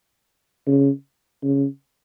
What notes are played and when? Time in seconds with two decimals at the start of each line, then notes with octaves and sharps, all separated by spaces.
0.67 C#3
1.43 C#3